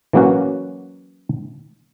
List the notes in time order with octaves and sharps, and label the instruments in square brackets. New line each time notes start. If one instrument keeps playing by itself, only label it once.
[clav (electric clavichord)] E3 F#3 A#3 C#4 F#4